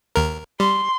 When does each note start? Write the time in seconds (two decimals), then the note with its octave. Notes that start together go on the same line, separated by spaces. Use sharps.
0.16 D#2 A#4
0.60 G3 C6